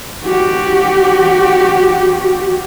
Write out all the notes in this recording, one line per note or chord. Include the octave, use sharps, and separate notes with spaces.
F#4 G4